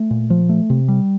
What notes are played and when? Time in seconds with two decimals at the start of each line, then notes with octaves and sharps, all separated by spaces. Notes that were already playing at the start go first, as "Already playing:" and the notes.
Already playing: A3
0.11 A#2
0.30 F3
0.49 A3
0.70 C3
0.88 G3